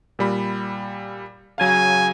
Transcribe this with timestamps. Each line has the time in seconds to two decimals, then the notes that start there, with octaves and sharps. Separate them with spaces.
0.19 A#2 G3 B5
1.58 C#3 F#3 F5 G#5